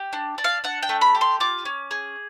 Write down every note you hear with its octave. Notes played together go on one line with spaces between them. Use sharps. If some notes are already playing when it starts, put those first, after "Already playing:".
Already playing: G4
D4
D4
F5
D4 F#5
G5
A3
B5
G4
C6
F4 D6
C#4
G#4